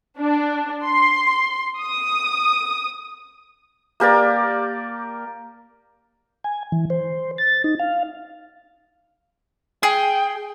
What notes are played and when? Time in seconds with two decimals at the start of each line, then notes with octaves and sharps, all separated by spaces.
0.19 D4
0.86 C6
1.81 D#6
4.00 A#3 G4 A#4 D5
6.44 G#5
6.72 E3
6.90 C5
7.38 A6
7.64 D#4
7.80 F5
9.83 G#4 G5